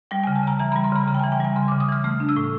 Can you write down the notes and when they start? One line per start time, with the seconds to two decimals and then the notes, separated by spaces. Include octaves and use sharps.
0.11 G3 G5
0.23 G#5
0.27 C#3
0.35 A5
0.43 C#3 A#5
0.59 E3 A#5
0.72 B5
0.76 G3
0.84 C6
0.92 C#3 B5
1.08 C#3 A#5
1.14 G5
1.19 G#5
1.24 E3
1.32 G5
1.40 G3 G#5
1.56 C#3 C6
1.68 D6
1.72 C#3
1.80 D#6
1.88 E3 F6
2.04 A3 F6
2.20 D4
2.29 E6
2.36 A2